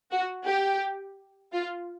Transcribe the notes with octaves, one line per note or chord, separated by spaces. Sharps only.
F#4
G4
F4